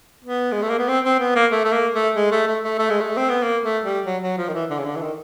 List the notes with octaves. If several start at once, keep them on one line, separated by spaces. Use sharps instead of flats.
B3
G#3
A3
A#3
B3
C4
C4
B3
A#3
A3
A3
A#3
A3
G#3
A3
A3
A3
A3
G#3
A3
C4
B3
A#3
A3
G3
F#3
F#3
F3
D#3
E3
D3
C#3
D3
E3
D#3